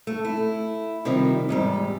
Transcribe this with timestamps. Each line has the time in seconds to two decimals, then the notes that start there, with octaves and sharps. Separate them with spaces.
0.07 A3
0.25 E4
1.05 C3 D#3 F3 G3
1.49 E2 G#2 G3